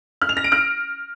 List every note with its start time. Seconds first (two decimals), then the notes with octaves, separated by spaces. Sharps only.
0.22 F6
0.29 F7
0.37 A#6
0.44 D7
0.52 F6